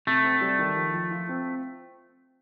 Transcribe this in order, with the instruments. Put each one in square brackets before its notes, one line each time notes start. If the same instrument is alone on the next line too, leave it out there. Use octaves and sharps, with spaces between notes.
[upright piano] C3 [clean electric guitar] A3
[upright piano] C4
G3
D#3
F3
F3
F4
C4